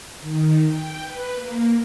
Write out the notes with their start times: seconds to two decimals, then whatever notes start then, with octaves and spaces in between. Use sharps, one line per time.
0.21 D#3
0.64 G5
0.99 B4
1.33 A#3